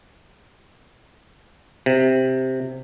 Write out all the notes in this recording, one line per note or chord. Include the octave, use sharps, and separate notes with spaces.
C3